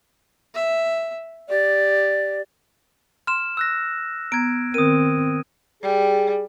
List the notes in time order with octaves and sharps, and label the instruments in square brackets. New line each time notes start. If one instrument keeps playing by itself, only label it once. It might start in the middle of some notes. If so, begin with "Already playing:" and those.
[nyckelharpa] E5
[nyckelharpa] G4 [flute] D5
[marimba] C6 [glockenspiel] F6 E7
[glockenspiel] E6 F#6 A#6
[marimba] B3 A#5 [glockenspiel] G#6 D7
[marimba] D#3 A#4 [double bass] C4 [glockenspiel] D#6 D#7
[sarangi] G3 [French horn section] G#4